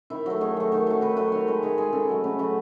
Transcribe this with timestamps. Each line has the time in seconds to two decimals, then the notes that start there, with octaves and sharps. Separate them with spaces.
0.10 D#3 E4
0.26 F#3 A3
0.41 D#3 G#4
0.57 F#3 A3
0.72 D#3
0.87 F#3 A3
1.01 D#3 B4
1.17 F#3 A3 B4
1.32 D#3 C#5
1.47 G#3 B4
1.62 D#3 G#4
1.78 G#3 G#4
1.93 C#3 A4
2.09 F#3 A3
2.24 C#3 B4
2.39 F#3 A3 B4